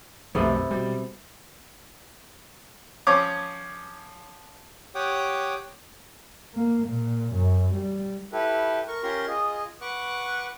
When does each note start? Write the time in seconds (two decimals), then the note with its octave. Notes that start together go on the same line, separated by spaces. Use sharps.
0.35 B1 F2 C3 D#3 A3 B3 A4
0.71 B2 G3
3.07 F3 C#4 C#5 D6 D#6
4.95 G4 C#5 F#5 G5 D6 D#6
6.54 A#3
6.87 A#2
7.34 F#2
7.74 G3
8.33 E4 G4 A4 B4
8.88 A#4 C#6
9.03 C#4 F4 G4 A#4 A#5 C6
9.27 F4 G#4 D#5
9.81 B4 F#5 C#6 D6 F#6